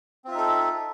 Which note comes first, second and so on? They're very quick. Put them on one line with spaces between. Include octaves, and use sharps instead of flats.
C4 F4 E5 D#4 A4